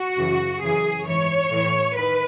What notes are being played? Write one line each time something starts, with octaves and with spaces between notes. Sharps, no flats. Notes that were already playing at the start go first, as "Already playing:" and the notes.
Already playing: F#4
F#2 C#3 E3
F#2 C#3 E3 G#4
G#2 E3 C#5
A2 E3
D#3 B4